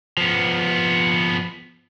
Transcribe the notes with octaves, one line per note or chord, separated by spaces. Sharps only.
F3 B3